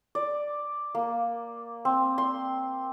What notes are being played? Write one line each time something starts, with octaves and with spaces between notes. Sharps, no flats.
D5
A#3
C4
C6